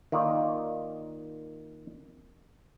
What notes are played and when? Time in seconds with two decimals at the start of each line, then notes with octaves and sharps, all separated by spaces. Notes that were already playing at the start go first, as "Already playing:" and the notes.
0.12 D#3 A#3 F4 D5